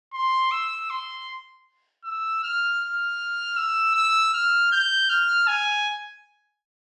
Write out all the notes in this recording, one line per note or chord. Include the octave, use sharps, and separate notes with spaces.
C6
E6
C6
E6
F6
F6
E6
E6
F6
G6
F6
G#5